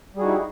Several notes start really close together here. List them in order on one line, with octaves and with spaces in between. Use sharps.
G3 G#4 F#4 D#4 E4